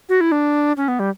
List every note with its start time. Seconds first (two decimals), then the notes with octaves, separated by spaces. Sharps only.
0.09 F#4
0.21 E4
0.32 D4
0.77 C#4
0.88 B3
0.99 G3